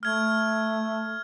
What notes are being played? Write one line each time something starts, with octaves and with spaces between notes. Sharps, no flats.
A3 F6 G#6